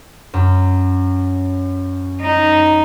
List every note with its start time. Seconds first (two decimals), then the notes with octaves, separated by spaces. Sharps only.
0.34 F#2
2.21 D#4